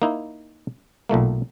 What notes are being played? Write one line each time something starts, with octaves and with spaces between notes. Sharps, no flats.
A#3 D#4 E4
B1 A#2 A3 A#3